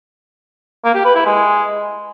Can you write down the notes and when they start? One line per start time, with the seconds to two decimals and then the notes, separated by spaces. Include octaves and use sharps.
0.84 A#3
0.94 G4
1.05 B4
1.15 E4
1.25 G#3